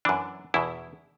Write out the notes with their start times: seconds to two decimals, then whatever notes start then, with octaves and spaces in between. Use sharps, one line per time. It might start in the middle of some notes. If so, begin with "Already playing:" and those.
0.05 F#2 E3 D4
0.54 E2 B2 E4